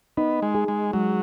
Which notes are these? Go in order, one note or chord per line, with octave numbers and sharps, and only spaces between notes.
B3 D#4
G#3
G#4
G#3
F#3 G#3